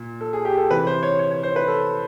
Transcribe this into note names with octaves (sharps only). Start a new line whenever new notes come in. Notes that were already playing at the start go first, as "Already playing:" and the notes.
Already playing: A#2
A4
G#4
G4
A4
C3 E3 B4
C5
C#5
C#5
C#5
C5
B4
A4